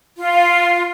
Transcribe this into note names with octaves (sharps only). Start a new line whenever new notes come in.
F4